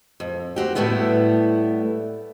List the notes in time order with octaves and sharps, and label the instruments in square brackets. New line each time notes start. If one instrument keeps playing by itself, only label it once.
[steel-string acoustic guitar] F2
C4 F#4 G4
A2 G3 A3 B3 E4